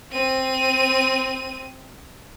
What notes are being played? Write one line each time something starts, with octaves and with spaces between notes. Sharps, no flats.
C4 D#7